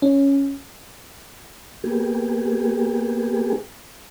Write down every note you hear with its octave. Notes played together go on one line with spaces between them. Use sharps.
C#4
A#3 B3 G4 G#4